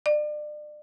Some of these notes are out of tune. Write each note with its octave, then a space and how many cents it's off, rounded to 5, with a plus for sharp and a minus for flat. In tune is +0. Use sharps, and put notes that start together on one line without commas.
D5 +35